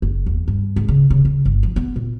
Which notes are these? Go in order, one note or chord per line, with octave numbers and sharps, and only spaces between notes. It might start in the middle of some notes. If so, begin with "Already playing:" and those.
F#1
E2
G2
G#1
C#3
C#3
C#3
G1
F3
B3
A#2